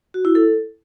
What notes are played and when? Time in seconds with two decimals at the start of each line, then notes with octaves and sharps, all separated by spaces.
0.14 F#4
0.25 E4
0.35 A4